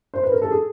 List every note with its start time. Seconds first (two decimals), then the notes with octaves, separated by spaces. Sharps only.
0.14 C5
0.23 B4
0.32 A#4
0.42 A4
0.51 G#4